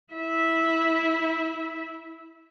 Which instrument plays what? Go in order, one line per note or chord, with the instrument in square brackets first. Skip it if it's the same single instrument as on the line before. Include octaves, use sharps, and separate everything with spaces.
[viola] E4 E5